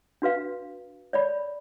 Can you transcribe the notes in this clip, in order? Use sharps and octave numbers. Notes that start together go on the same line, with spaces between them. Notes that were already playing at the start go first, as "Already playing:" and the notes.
D4 F#4 B4 F5
C#5 D5 B5